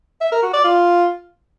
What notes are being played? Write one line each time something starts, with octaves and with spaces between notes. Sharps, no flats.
E5
A#4
F#4
D5
F4